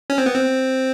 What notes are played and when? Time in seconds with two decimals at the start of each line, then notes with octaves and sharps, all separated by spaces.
0.10 C#4
0.18 C4
0.26 B3
0.35 C4